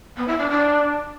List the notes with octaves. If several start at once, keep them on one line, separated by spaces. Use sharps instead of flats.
B3
E4
D4
D4